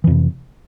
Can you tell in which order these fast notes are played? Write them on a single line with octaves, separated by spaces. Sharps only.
E3 F2 C3